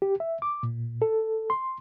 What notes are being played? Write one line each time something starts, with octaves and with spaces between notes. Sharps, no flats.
G4
E5
D6
A#2
A4
C6